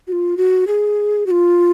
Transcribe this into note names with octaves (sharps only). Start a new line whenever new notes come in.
F#4
F4
F#4
G#4
F#4
F4